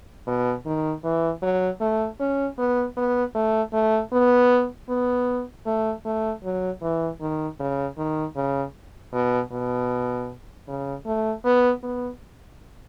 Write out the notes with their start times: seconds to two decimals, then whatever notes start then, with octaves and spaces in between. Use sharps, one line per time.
0.27 B2
0.66 D#3
1.04 E3
1.43 F#3
1.81 A3
2.20 C#4
2.58 B3
2.97 B3
3.35 A3
3.73 A3
4.13 B3
4.89 B3
5.66 A3
6.05 A3
6.44 F#3
6.82 E3
7.21 D#3
7.60 C#3
7.98 D#3
8.36 C#3
9.13 B2
9.52 B2
10.68 C#3
11.06 A3
11.45 B3
11.83 B3